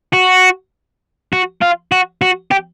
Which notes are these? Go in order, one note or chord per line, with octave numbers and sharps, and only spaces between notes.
F#4
F#4
F4
F#4
F#4
G4